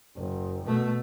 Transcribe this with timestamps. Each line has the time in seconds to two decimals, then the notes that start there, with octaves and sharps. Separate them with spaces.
0.16 F#1
0.65 B2 A3